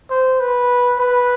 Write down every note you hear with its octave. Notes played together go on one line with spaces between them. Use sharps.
C5
B4
B4